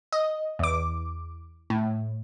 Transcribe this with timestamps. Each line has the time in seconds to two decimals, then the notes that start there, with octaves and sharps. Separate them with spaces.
0.12 D#5
0.59 E2 D6
1.70 A2